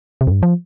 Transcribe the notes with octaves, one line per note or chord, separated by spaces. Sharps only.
C3
F2
G2
F3